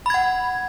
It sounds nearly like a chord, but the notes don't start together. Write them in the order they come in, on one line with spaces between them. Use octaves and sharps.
B5 G#6 F#5